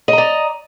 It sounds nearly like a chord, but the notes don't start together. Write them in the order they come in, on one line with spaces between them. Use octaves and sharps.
D#5 A#5 D5